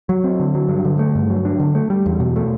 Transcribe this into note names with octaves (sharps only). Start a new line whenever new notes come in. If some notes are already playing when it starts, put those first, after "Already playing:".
F#3
C4
D3
F#3
G2
D3
A3
G2
F#3
D4
D3
A3
G3
E2
B2
A3